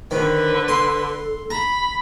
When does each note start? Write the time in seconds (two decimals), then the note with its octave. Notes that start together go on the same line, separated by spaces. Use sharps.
0.11 D3 D#3 B4 C5
0.68 A4 C6
1.50 A#5 B5